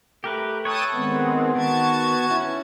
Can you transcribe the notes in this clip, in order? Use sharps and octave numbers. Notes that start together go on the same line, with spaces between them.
A3 G4 A#4 B4
A4 B4 C#5 G5 A5 D#6
D#3 G#3 B3 C4
D#3 F#4 A5 G#6
C#4 E4